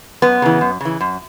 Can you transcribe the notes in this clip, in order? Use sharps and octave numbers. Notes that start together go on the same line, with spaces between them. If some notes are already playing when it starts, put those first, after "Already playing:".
F#2 B3
C#3 E3
F#2
C#3 E3
F#2